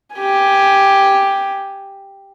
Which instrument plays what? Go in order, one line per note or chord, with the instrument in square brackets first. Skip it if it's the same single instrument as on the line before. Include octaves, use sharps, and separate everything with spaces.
[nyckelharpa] G4 G#5